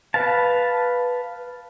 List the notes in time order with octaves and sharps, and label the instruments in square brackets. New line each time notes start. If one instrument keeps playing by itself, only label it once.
[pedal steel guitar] B4 F5 A5